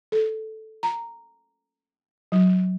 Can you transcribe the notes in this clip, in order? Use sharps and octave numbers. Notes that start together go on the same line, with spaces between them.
A4
A#5
F#3